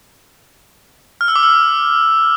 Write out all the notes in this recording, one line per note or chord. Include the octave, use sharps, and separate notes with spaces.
F6
E6
D6
E6